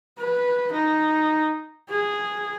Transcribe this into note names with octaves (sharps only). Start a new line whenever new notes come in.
B4
D#4
G#4